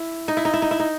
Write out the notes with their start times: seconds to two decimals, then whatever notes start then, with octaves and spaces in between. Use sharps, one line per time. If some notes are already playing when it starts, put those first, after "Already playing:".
Already playing: E4
0.28 D#4
0.37 E4
0.45 D#4
0.54 E4
0.62 D#4
0.71 E4
0.80 D#4